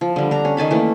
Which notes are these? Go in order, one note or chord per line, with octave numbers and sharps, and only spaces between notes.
F3
D3 G3
D4 A#5
C#4
D#3 G#5 A5 B5
E3 A3 A#3